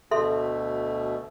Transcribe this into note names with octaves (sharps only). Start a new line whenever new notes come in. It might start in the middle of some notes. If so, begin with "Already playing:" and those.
D2 B2 A3 A4 E5 C6